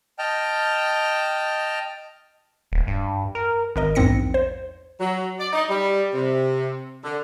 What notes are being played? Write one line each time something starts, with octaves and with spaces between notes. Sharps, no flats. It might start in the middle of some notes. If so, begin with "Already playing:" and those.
D#5 G5 A5 F6
D#1
G2
A#4
G#1 A#4 D#5
A#1 E2 G#2 C4 A#6 C#7
C5
F#3
D5
D#4
G3
C3
D3